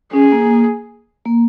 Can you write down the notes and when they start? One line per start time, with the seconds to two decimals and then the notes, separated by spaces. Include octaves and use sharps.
0.13 C#4 G#4
0.32 A#3
1.25 A#3